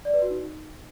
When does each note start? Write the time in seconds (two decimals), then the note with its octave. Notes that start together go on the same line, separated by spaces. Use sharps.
0.05 D5
0.14 B4
0.22 F#4
0.30 D#4